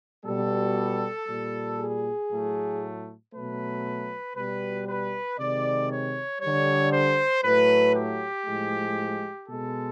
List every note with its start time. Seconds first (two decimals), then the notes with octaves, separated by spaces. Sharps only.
0.25 B2 G3 A4
1.27 A#2 G3
1.79 G#4
2.30 A2 F#3 A3
3.33 B2 F#3 A3 B4
4.36 B2 G3 B4
4.87 B4
5.38 C3 D#3 G#3 D5
5.90 C#5
6.40 D3 G3 C#5
6.92 C5
7.44 A2 F#3 A3 B4
7.95 G4
8.46 A2 F3 G#3
9.48 B2 G#3 A4